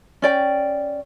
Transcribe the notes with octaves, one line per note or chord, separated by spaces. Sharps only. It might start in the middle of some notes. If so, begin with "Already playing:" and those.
C#4 D5 G5